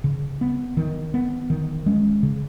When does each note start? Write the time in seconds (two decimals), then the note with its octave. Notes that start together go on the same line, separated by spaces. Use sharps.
0.04 C#3
0.41 B3
0.77 D#3
1.14 B3
1.50 D#3
1.86 G#3 C#4
2.23 C#3